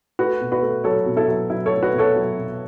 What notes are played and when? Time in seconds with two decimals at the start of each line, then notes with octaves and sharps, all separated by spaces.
0.19 A3 F#4 B4
0.41 B2
0.52 F#4 B4
0.62 A3
0.84 F#3 A4 C#5
1.06 B2
1.17 E4 A4
1.28 F#3
1.50 F#3 E4
1.66 A4 C#5
1.72 A3
1.82 F#4 B4
1.93 B2
1.98 A4 C#5
2.16 F#3
2.38 B2